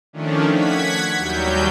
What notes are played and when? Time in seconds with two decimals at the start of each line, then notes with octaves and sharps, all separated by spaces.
0.13 D#3 F3 A3 C#4 D4
0.53 F#5 G#6 B6
1.17 D#2 F#3 G3 G6